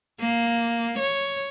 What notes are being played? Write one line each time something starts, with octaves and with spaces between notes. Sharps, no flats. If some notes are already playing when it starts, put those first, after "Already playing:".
A#3
C#5